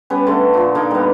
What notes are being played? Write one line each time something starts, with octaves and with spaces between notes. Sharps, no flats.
G3 B3 C#4 B4
D3 A3
A#2 F3
D3 A#3 D#4
G3 B3